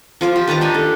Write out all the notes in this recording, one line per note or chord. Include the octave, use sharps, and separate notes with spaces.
F3 F4 D6
G4
D#3 B4 A5 A#5
D4 G4 G#5
A4